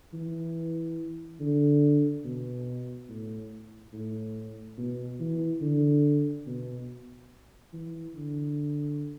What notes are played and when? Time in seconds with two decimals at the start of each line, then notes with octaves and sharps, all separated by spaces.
0.14 E3
1.40 D3
2.25 B2
3.09 A2
3.93 A2
4.78 B2
5.20 E3
5.62 D3
6.47 B2
7.73 E3
8.15 D3